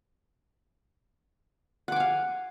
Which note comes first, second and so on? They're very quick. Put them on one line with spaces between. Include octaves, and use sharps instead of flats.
F#5 D6 G#5 F5